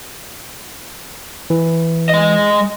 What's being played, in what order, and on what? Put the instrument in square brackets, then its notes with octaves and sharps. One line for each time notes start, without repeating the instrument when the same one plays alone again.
[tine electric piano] E3
[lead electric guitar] G#3 D#5